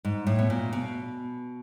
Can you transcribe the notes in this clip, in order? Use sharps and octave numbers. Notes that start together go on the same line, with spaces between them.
G#2
A2
B2
A#2
B2